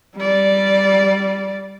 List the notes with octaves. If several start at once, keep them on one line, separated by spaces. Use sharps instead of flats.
G3 D5